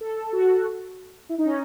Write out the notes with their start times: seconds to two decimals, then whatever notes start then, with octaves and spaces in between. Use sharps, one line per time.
0.01 A4
0.33 F#4
1.29 E4
1.38 D#4
1.46 C#4